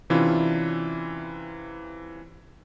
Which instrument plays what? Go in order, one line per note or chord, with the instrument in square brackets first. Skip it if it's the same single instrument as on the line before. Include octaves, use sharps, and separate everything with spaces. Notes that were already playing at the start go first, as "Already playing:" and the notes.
[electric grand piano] C3 E3 C#4 D4 E4 F4